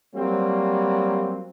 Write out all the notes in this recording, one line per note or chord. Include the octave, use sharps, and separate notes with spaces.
F#3 G3 A#3 C4